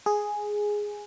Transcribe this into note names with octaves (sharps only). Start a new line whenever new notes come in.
G#4